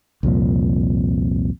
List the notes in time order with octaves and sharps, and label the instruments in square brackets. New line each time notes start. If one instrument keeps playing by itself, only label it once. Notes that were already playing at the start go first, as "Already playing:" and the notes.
[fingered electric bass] C2 F2 A#2